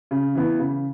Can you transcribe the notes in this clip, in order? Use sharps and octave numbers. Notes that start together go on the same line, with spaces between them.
C#3
E3 B3
C#3